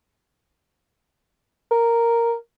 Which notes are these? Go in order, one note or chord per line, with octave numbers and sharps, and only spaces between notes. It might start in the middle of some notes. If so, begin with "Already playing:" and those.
A#4